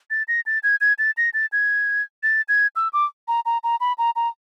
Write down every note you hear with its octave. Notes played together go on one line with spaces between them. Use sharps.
A6
A#6
A6
G#6
G#6
A6
A#6
A6
G#6
A6
G#6
E6
D6
A#5
A#5
A#5
B5
A#5
A#5